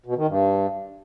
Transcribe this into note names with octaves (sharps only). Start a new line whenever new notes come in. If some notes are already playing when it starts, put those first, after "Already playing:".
B2
D#3
G2